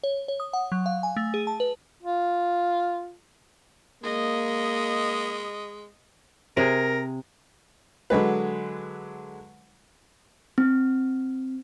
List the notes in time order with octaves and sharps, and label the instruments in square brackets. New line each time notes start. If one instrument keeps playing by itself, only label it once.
[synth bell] C#5
C#5
D#6
F#5
F#3
F5
G#5
A3
G#4
A5
B4
[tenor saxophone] F4
[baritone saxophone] G#3 [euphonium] A#3 [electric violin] D#5
[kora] C3 G#4 [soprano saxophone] A#4
[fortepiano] D3 F#3 G#3 B4
[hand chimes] C4